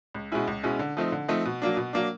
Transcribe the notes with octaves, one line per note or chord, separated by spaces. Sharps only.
C#2
B2 G#3 C#4 E4
C#2
B2 G#3 C#4 E4
D3
F3 A3 C4 D#4
D3
F3 A3 C4 D#4
B2
F#3 A#3 D4
B2
F#3 A#3 D4